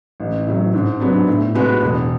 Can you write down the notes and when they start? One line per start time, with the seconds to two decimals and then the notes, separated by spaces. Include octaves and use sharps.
0.20 A1
0.47 A2 F#3
0.74 G#2
1.00 F#3 B3 D4
1.28 A2
1.55 G#3 B3 F#4 B4
1.82 E1